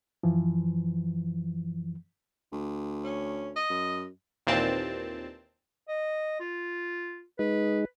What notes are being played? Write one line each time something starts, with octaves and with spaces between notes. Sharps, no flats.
F#2 E3 F3
D2
C#4
D#5
F#2
D#2 A#2 E3 C4 A5
D#5
F4
G#3 D#4 B4